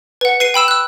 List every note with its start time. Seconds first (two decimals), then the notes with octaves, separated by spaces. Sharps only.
0.21 B4 F#5
0.40 B4 C7 D#7
0.54 G5 B5 E6 E7
0.68 E6 F#6